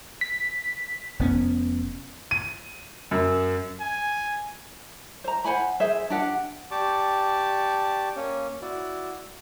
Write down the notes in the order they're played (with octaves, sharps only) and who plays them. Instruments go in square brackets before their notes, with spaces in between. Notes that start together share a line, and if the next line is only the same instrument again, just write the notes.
[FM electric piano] B6
[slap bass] F1 B3 C#4
[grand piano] D#7
F#2
[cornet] G#5
[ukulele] C5 A#5
C5 F#5 G#5 B5
G#4 C5 E5
D4 G4 F#5
[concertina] G4 D5 A5 C#6 D6
A#3 C#4 C#5
E4 F#4 D5